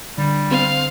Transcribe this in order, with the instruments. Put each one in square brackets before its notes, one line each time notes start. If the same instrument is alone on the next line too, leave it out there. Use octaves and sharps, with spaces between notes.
[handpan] D3 [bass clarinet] G3
[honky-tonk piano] C4 [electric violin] F5